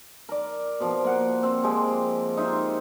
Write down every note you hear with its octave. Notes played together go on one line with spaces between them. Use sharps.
A#4 D5
B2 F3
A#3 F#5
C4
F3 G#3 G4
D#4 F4 E5